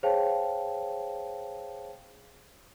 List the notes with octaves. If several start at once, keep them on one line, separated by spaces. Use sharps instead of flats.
G#4 C5 C#5 F5 G5 A5